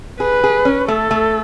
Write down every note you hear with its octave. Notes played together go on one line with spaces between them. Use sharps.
G#4 B4
G#4
C#4
A3 A4
A3